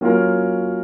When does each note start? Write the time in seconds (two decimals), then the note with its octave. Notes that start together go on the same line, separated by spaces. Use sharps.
0.01 F#3 A#3 C#4 F4 A#4